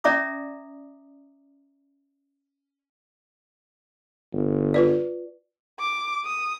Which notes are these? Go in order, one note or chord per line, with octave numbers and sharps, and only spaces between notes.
C#4 D5 E5 A#5 D6 D#6
G1
F4 B4 D5
D6
D#6